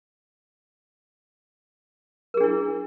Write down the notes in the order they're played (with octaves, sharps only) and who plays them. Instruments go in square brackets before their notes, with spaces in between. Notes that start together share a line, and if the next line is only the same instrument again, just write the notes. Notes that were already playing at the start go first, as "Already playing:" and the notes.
[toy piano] A#4
G#4
D4
E4